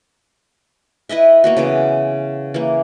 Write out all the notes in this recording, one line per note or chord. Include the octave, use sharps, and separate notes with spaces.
E4 B4 D#5 E5
A#3 B3 F#4
C#3 E3 B3
E3 A#3